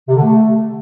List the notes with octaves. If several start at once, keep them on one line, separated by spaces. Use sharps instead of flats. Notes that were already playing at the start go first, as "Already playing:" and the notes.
C3
D3
A3